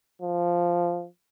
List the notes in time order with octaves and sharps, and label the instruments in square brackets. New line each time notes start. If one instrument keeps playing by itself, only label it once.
[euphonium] F3